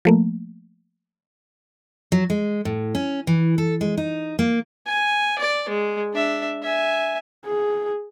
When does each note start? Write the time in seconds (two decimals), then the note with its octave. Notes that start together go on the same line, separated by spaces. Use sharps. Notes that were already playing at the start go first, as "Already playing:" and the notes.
0.05 F3 A3 A#3
2.12 F#3
2.30 G#3
2.65 A2
2.95 C#4
3.27 E3
3.58 A4
3.81 G#3
3.97 D#4
4.39 A#3
4.86 G#5
5.38 D5
5.69 G#3
6.13 D4 E5
6.62 E5 G#5
7.46 G#4